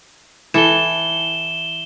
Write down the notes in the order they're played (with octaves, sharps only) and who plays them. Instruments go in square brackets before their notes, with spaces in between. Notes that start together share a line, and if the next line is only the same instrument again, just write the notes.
[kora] E3 A4 [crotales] E7 G7